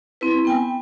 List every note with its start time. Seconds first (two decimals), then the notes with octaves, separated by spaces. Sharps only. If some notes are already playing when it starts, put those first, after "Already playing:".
0.21 C4 E4 B4
0.45 B3 G5 G#5